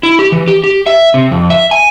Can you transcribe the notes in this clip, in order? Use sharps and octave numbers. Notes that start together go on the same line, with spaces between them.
E4
G4
E3
G4
G4
E5
C3
F2
E5
G#5